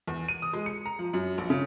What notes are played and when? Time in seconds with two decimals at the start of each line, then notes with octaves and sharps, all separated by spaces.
0.08 E2
0.28 D#7
0.42 D#6
0.53 G#3
0.66 C#7
0.86 A#5
0.99 F3
1.14 F#2
1.38 A#1
1.50 C#3